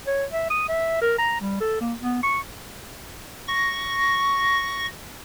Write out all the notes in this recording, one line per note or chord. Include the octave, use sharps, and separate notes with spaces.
C#5
E5
D#6
E5
A#4
A#5
G3
A4
A#3
B3
C#6
C#6 A#6